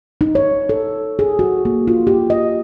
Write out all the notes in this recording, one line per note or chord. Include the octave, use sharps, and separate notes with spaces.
D#4
C#5
A4
G#4
F#4
A#3
F4
G4
D#5